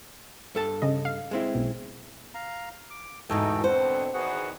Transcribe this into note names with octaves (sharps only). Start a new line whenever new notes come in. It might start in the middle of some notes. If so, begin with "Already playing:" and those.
G2 A4 A5
C#3 D#5
F5
G#3 C4 E4
B1
F5 A#5
D6
E2 G#2 B2 A3 D#4 A4 G5
B2 D3 C4 C5 F#5
E2 D#3 B3 F#4 G#4 F#5